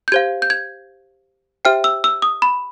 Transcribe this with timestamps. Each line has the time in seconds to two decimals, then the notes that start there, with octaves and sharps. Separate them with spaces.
0.08 G6
0.12 G4 C5 F5 G#6
0.42 G6
0.50 G#6
1.65 G4 C5 E5 G5 F6
1.84 E6
2.04 E6
2.22 D#6
2.42 B5